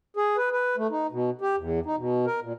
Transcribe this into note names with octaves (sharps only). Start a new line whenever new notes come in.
G#4
B4
B4
A3
D#4
B2
G4
E2
D#4
B2
A#4
A#2